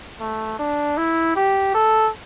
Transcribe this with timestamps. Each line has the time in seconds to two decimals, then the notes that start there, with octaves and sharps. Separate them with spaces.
0.20 A3
0.59 D4
0.97 E4
1.36 G4
1.75 A4